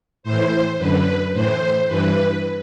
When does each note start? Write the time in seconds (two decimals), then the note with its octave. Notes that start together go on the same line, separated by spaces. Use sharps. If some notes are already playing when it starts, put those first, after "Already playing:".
0.23 A2 E3 C5
0.78 F#2 D3 B4
1.33 A2 E3 C5
1.87 G2 E3 B4